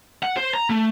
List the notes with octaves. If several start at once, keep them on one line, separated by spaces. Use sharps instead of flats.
F#5
C5
A#5
A3